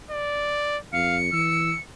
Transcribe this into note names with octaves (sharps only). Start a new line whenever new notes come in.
D5
F2 F5 C#7
E3 E6